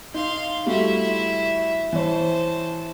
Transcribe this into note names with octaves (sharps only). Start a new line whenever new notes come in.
D#4 F5 C6
G3 A3 E4 F#4 E5
E3 C5 C#5 A5